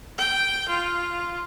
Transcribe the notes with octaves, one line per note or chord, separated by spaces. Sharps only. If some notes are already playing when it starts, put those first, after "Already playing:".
G5
F4